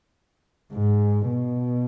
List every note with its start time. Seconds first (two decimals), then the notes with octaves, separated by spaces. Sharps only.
0.73 G#2
1.27 B2